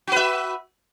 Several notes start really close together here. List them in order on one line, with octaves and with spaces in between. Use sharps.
F#4 B4 E5